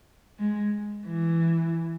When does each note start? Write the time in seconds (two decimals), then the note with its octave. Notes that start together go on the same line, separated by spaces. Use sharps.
0.39 G#3
1.07 E3